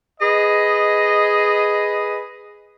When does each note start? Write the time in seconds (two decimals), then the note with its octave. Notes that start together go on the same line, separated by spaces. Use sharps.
0.21 G#4 B4 D#5